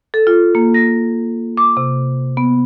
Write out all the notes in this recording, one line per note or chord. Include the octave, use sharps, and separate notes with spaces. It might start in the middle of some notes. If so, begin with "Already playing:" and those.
A4
F4
A#3
A#6
D6
C3
B3